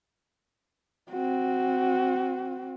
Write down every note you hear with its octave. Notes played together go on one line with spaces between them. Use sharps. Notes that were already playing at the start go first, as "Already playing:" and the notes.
C4 F#4